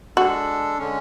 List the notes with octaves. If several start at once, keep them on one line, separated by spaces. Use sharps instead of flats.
G#3 D4 F#4 A4
D3 G#3 C#4